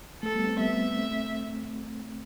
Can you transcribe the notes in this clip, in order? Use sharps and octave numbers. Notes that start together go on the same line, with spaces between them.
A3 A4
G3 B3
A3 C4
G3 B3 E5
A3 C4